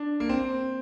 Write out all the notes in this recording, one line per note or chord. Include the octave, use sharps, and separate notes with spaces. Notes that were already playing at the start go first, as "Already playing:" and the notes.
Already playing: D4
A#3
C4